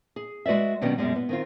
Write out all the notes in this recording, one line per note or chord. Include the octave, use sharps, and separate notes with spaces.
G#4
G#3 F#4 B4 D5 E5
B2 D#3 F#3 G3 B3 C#4
F#2 B2 E3 G3 G#3
B3
D#3 C4 F4